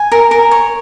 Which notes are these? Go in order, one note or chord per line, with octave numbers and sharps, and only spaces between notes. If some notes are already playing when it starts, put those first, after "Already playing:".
Already playing: G#5
A#4
A#4
C#5